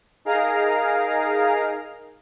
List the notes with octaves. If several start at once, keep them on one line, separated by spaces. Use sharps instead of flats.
D#4 G#4 A#4 F5 A#5